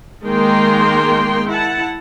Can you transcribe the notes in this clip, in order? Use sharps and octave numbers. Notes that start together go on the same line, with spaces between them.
D#3 G#3 A#3 A#4 G5 C6
E4 F#5 A5